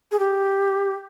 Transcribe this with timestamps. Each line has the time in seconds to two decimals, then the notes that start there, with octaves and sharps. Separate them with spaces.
0.11 G#4
0.19 G4